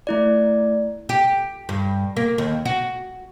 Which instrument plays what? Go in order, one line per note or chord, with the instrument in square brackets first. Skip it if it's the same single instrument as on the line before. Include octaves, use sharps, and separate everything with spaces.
[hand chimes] A3 E4 D5
[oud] G4
G2
A#3
D#2
F#4